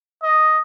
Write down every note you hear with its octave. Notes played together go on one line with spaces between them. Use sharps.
D#5